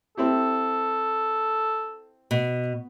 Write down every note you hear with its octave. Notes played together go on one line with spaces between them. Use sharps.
C4 E4 G4 A4
B2